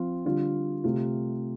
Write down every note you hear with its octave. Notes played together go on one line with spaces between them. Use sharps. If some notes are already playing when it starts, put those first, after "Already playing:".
Already playing: F3 C4 F4
D3 G3 F4
C3 A3 F4